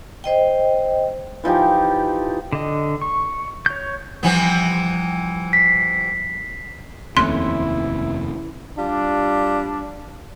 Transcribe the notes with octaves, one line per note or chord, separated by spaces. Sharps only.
C5 D#5 G5
E3 F3 D#4 G4
D3 D#5
C#6
C#5 G6
C3 E3 F3 G3 B3
B6 C7
F1 D#2 C3 E3 A3 C#4 E4 C6
G3 D4 F4